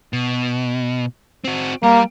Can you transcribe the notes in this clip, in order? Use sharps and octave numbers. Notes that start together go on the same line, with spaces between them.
B2
C4 F#4
G3 A#3